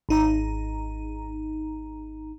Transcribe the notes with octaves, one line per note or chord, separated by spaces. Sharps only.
G#1 D#4 A#5